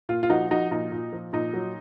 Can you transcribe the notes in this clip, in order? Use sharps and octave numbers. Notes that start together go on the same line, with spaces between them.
A#2 F4
F4
F3 D#4 F#4
F3 D#4 F#4
A#2 D#4
A#2
F3
A#2 D#4
F#3